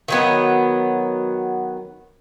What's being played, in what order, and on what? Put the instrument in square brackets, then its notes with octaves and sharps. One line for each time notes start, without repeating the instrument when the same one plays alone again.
[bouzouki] D#3 F#3 B3